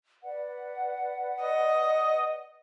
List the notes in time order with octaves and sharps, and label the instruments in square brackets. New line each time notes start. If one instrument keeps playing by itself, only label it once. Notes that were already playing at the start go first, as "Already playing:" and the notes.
[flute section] B4 D5 F#5
[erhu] D#5